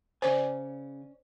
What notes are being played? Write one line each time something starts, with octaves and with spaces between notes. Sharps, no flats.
C#3 C#4 C5 D5 G#5